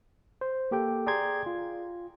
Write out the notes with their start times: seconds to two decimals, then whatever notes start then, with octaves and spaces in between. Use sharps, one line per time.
0.41 C5
0.71 A#3 G4 A4 G5
1.06 G#4 D5 G5 A#5 C6 G#6
1.46 F4